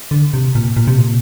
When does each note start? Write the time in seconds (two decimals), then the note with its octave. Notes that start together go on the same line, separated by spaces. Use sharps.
0.11 D3
0.34 C3
0.55 A#2
0.77 A#2
0.88 C3
0.98 A#2